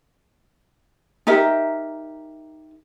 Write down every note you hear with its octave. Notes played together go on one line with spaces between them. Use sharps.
D#4 G4 A#4 E5